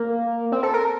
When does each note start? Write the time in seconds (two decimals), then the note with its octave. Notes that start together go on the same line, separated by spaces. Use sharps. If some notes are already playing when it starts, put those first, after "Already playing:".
Already playing: A#3
0.52 C4
0.63 A4
0.74 A#4